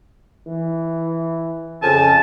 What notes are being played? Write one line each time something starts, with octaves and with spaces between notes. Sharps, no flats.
E3
F2 C#3 G#5 A5